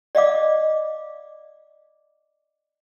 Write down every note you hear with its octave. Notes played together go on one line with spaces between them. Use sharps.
D5 D#5 F5 D6